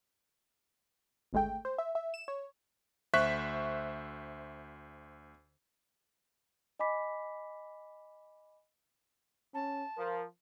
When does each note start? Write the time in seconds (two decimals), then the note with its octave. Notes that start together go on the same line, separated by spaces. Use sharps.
1.33 G#1 D2 G#3 A3 G5
1.65 C5
1.78 E5
1.95 E5
2.14 E7
2.28 C#5
3.13 D2 C5 E5 C#6 F#6 B6
6.79 D#5 G#5 B5 D6 B6
9.54 C#4 A5
9.97 F3 A#4